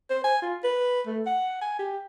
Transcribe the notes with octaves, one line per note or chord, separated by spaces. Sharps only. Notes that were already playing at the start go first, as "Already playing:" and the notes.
C5
G#5
F4
B4
A3
F#5
G#5
G4